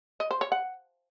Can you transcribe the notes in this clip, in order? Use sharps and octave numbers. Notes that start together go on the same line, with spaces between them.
D#5
C5
C#5
F#5